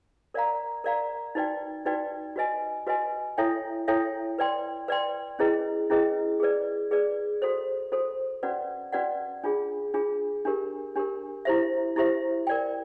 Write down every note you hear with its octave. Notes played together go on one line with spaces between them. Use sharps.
A#4 D5 F5 A#5
A#4 D5 F5 A#5
D#4 F#4 B4 D5 G5
D#4 F#4 B4 D5 G5
F#4 B4 D#5 G#5
F#4 B4 D#5 G#5
E4 A4 C#5 E5 G5
E4 A4 C#5 E5 G5
B4 D5 G5 C6
B4 D5 G5 C6
C#4 E4 G#4 B4 D#5
C#4 E4 G#4 B4 D#5
G#4 B4 D5
G#4 B4 D5
F#4 A4 C5
F#4 A4 C5
C#4 F#4 B4 D5 F#5
C#4 F#4 B4 D5 F#5
D4 F4 G#4
D4 F4 G#4
D4 G4 A#4
D4 G4 A#4
E4 G4 C5 E5
E4 G4 C5 E5
A#4 D5 G5